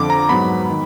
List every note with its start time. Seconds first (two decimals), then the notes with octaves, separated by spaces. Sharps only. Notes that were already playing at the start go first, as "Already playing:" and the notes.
Already playing: F2 D3 F3 D6
0.10 A#5
0.29 G#2 F#3 B3 B5
0.70 D#3